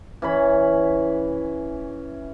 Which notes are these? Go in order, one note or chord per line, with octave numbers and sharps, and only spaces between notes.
E3 C#4 B5